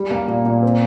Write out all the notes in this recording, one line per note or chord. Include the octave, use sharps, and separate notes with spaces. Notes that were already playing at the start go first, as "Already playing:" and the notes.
Already playing: G3
A#3
A#2
A#2
C4